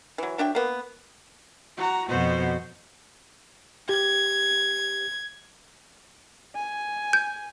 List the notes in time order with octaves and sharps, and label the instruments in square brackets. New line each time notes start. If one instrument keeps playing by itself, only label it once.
[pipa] E3 F#3
F#3 D4 E5 G5
A#3 B3
[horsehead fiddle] F#4 A#5
[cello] F2 B2 [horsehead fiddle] F#4 C5
[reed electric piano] G4 [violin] G#6
[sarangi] G#5
[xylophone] G6